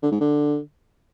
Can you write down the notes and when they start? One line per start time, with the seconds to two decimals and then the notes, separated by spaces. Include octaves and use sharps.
0.03 D3
0.11 G#2
0.20 D3